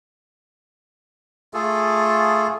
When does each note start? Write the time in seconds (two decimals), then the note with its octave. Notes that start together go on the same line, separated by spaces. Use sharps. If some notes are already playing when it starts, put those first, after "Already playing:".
1.54 A3 F4 G#4 A4